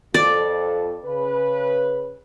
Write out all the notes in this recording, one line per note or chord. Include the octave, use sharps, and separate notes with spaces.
F2 F3 A4 D5
C#3 B4